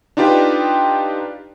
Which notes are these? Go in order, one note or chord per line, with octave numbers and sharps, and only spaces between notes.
D4 D#4 F4 G4 B4 G5